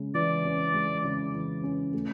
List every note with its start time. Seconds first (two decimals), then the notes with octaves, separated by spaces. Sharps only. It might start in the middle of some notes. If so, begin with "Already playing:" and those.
Already playing: C#3 G#3
0.14 E3 D5
0.45 C#4
0.74 G#3
1.04 C#3
1.34 E3
1.64 C#4
1.93 A3